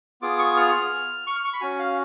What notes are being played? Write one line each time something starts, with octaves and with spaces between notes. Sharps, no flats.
B3 F4 G#4 D6
C#6
F6
C#6
F6
C#6
B5
C#4 F#4 G#5
F5